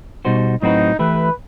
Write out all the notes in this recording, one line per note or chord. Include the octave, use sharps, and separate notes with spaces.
B2 G3 D#4 F#4 C5
A2 F#3 C4 D#4 F#4 B4
E3 A3 E4 G4 B4